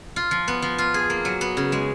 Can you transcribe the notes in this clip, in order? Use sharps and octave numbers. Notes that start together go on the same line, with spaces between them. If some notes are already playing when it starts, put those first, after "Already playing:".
F4
F3
B3
F3
F4
G#4
A#3
F#3
B3
C#3
G#3